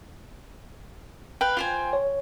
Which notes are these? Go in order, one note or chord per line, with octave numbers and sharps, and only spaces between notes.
B4 F5 G5
F4 C5 G#5
C#5